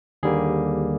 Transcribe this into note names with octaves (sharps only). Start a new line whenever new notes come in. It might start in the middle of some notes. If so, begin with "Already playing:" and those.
D#2 D3 G3 A#3 G#4